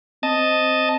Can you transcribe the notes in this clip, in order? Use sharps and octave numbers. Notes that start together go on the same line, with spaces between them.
C4 D#5 A5